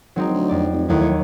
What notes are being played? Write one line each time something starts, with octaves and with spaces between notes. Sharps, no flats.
G#1 F#3 C4 D#4
D2
F2 D5
F1
D#2 A2 F#3
C#5